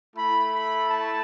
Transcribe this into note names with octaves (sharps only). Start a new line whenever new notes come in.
A3 E4 B5
B5
A5